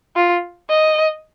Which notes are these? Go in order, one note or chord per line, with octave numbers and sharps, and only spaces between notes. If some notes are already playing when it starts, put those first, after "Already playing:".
F4
D#5